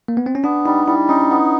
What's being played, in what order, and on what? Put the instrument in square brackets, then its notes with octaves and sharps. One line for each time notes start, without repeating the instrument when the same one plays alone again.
[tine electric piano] A#3
B3
C4
C#4
[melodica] B3 [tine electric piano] D4
[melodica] G3 [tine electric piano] D#4
[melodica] G3 [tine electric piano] E4
[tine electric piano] C#4 [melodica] D#4
[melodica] B3